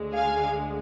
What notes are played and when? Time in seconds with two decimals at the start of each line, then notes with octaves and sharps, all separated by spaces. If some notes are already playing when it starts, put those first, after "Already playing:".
Already playing: D2 D3 G#3
0.13 F5 G#5